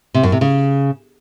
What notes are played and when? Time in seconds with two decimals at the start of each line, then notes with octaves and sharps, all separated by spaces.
0.14 C3
0.23 F#2
0.32 C3
0.41 C#3